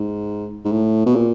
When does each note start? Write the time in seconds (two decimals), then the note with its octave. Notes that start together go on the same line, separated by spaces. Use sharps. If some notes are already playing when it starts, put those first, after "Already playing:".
Already playing: G#2
0.65 G#2
0.72 A2
1.06 B2
1.15 A#2